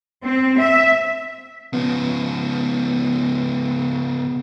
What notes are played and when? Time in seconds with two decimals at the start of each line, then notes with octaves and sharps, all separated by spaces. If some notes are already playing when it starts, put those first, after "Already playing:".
0.23 C4
0.60 E5
1.73 C#3 F3 B3